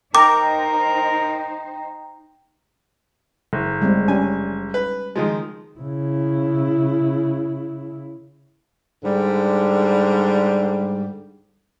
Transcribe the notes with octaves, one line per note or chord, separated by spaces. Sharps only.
D#4 A#4 C5 G5 A#5 D6
F#1
G3 G#3 C4
C#4 D4 G4 G#5
B4
D#3 F3 G#3
C#3 E4
G#2 D3 G3